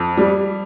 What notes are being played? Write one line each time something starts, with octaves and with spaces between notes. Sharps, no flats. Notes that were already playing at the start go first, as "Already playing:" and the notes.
Already playing: F2
G3